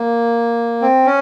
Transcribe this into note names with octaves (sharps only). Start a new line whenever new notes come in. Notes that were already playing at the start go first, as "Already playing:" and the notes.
Already playing: A#3
C4
C#4